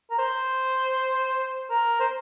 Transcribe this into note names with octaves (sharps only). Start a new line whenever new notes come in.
A#4
C5
A#4
C5